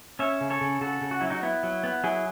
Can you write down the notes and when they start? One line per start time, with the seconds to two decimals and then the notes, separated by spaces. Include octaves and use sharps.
0.19 C#4 C#5 E5
0.41 C#3
0.50 A4 C#5
0.61 C#3
0.81 C#3 F#4 A4
1.01 C#3
1.11 F#4
1.21 F#3 E4
1.30 D#4 F#4
1.43 B3 E4
1.63 F#3
1.84 B3
2.04 F#3 E4 G#4